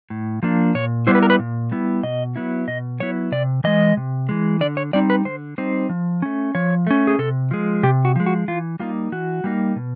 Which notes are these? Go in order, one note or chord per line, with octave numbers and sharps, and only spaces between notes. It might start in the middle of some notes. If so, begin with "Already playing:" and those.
A2
F3 A#3 D4
A#2 C#5
G3 B3 E4 C5
B4
A#4
B4
A#2
G3 B3 E4
B2 D#5
F#3 B3 E4
B2 D#5
F#3 B3 E4 C#5
C3 D5
E3 G#3 D#5
C3
E3 G#3
D3 D5
C#5
G3 C4 D#4 D5
B4
D3 C5
G3 C4 D#4 C5
F3
A3 C#4
F3 C#5
A3 C#4
G#4
C3 A4
F3 G#3
C3 G4
F#4
F3 G#3
F#4
E3 F4
G3 A#3 D#4 F4
E3 F#4
G3 A#3 D#4
B2